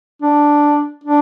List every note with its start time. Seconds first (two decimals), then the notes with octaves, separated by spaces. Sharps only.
0.22 D4
1.04 D4